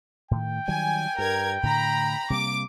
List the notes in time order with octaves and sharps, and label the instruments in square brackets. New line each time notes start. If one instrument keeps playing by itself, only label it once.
[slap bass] A2 D#3 [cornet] G5
[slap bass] D#3 F#3 G3 [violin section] G#5
[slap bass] G2 [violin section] A#4 G#6
[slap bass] A2 D3 [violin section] A#5 B5
[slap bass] C3 G3 A#3 [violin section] D6